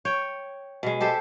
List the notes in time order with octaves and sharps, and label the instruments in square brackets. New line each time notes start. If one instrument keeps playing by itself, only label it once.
[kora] C#5 G5
B2 G#3
G4 A4 C5 E5